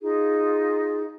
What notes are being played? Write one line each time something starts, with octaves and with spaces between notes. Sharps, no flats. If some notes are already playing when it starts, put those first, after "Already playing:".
D#4 F4 G#4